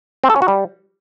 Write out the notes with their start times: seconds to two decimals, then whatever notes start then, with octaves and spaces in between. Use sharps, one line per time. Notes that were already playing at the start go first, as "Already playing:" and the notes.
0.24 C4
0.30 A4
0.36 C#4
0.42 F#4
0.48 G3